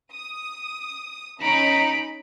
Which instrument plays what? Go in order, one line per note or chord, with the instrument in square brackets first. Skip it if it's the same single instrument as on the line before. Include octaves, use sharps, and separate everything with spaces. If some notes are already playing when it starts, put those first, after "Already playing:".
[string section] D#6
[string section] C#4 D#4 [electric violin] B5 D7